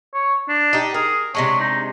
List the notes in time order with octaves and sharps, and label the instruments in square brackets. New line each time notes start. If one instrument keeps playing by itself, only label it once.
[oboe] C#5
D4
[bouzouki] D#4 G4
[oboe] G#4 [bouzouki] A#4
[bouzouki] C3 G#3 D4 [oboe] C#5
[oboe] D#4